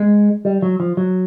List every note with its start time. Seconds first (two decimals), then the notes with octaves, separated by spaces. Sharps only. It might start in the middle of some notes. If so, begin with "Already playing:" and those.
Already playing: G#3
0.45 G3
0.62 F#3
0.80 F3
0.97 F#3